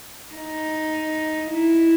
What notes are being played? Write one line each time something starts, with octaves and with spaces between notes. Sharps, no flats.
D#4
E4